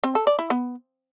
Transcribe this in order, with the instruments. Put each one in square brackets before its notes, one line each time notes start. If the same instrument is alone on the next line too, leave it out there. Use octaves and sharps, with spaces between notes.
[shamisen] C4
A4
D5
E4
B3